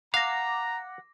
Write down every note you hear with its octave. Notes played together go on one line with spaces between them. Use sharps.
F5 F#5 A#5 D6 A#6